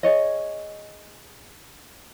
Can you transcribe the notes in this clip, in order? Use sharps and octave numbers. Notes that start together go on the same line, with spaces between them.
G#4 C#5 D#5